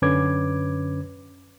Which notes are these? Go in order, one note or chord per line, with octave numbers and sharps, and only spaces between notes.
F#2 D3 C#4 B4 D6 G#6